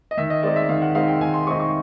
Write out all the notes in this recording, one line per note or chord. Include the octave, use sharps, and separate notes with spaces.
D#5
D#3 E5
D#5
G#3 C4 D#4 D5
E5
D#3 F5
F#5
G#3 C4 D#4 F5
G5
D#3 G#5
C6
G#3 C4 D#4 C#6
C#6